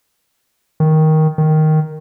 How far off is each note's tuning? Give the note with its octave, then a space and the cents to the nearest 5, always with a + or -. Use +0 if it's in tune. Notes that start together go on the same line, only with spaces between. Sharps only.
D#3 +10
D#3 +0